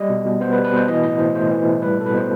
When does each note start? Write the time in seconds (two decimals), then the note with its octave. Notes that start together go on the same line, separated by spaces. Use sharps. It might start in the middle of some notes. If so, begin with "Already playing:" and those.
Already playing: G3 D#5
0.09 B2
0.25 B2
0.40 B3 C5
0.53 B4
0.57 G3
0.65 B4
0.73 B2 C5
0.88 E3 D#5
1.03 A2 D#5
1.19 A2 C5
1.35 A3 C5
1.51 E3
1.66 A2
1.82 G3 B4
1.98 B2 A4
2.06 B4
2.14 B2 C5